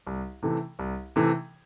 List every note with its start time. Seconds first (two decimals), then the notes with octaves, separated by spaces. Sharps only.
0.07 C2
0.43 C3 E3 A3
0.79 C2
1.16 C3 E3 A3